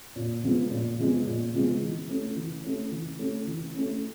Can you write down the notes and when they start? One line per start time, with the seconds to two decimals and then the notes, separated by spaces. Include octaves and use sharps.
0.16 A#2
0.43 F3 G#3 B3
0.71 A#2
0.99 F3 G#3 B3
1.26 A#2
1.54 F3 G#3 B3
1.82 E3
2.09 A3 C#4
2.36 E3
2.64 A3 C#4
2.91 E3
3.19 A3 C#4
3.47 E3
3.74 A3 C#4